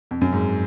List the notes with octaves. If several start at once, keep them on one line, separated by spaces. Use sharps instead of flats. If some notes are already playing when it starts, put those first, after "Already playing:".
F2
F#2
G#2